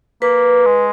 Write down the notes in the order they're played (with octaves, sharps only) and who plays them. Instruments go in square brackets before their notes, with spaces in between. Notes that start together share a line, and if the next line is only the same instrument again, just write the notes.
[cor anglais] A#3 [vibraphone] B4
[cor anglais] G#3